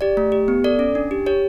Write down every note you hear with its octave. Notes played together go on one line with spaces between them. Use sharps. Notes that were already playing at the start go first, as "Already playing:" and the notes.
G4 D5
A3
G4
B3
A4 D5
C#4
D4
G4
G4 C#5